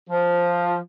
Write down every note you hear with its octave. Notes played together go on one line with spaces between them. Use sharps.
F3